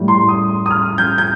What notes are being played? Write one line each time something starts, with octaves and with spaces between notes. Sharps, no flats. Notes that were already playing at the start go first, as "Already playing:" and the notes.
Already playing: A2 G3
C6
D#6
D#6
F6
G6
G6